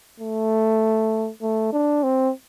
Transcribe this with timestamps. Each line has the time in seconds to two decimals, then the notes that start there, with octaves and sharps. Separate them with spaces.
0.20 A3
1.42 A3
1.73 D4
2.03 C4